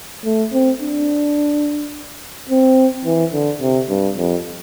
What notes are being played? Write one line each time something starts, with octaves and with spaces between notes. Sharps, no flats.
A3
C4
D4
C4
E3
D3
C3
G2
F2